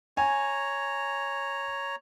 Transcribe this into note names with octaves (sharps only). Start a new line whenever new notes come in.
C#5 G#5 A#5